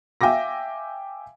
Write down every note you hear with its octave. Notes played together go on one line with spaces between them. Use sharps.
E5 F5 G5 G#5 D6 A#6